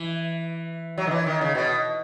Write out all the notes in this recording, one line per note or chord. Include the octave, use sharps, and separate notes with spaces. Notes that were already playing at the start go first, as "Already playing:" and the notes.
Already playing: E3
F#3
D#3
E3
D#3
C#3
B2